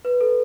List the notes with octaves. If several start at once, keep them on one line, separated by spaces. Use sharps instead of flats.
B4
A4